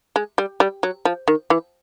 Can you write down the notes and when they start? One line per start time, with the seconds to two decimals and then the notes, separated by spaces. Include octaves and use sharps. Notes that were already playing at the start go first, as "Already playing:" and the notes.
0.16 G#3
0.38 G3
0.60 G3
0.83 F#3
1.05 F3
1.28 D#3
1.50 E3